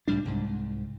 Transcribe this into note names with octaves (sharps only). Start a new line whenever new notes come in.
C#2 A2 G3 D4
C2 G#2